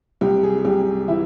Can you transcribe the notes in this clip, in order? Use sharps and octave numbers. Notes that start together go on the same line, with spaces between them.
C2 G4
G#4
C2 G4
E3 E4